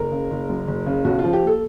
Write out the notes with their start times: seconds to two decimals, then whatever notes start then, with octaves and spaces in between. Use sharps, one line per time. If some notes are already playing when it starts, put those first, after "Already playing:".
Already playing: F#1 A#4
0.12 C#3
0.31 F#1
0.49 F#2
0.68 F#1
0.86 C#3
1.04 B1 F#4
1.19 F4
1.24 F3
1.33 G4
1.42 A#3
1.47 A4